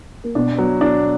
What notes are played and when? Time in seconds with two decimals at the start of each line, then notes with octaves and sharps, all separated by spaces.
0.24 A#3
0.35 B2 B3 D4
0.58 F#3
0.81 D4